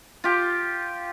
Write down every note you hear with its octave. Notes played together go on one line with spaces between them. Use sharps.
F4 G4